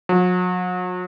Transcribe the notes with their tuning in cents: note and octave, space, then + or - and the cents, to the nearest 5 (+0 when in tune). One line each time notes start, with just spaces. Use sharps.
F#3 -40